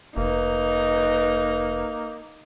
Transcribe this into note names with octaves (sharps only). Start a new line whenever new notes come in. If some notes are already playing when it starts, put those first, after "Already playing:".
F1 A#3 D#4 B4